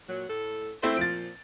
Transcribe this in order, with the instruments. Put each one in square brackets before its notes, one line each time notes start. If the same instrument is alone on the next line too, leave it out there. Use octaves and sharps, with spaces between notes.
[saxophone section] A#2 F#3
A2 A4
[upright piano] A3 C4 E4 [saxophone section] C5
[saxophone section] A#2 F3 [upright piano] A6 D7